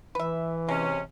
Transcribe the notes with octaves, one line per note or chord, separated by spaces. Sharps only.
E3 B4 E5
C3 G#3 C#4